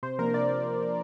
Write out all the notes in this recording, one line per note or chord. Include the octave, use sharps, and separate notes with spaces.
C3 C5
F3 A#3 D4 A#4
C3 D5